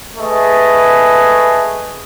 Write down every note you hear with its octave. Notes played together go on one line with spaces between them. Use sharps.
A3 G#4 B4 D#5